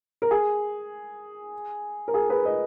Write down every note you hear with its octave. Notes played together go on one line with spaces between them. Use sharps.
A#4
G#4
A#4
G#4
G#4 B4
B4 D#5